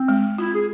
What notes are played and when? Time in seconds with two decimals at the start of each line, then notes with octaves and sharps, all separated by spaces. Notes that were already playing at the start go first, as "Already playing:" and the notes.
Already playing: C4
0.08 G#3
0.38 E4 F4
0.53 G#4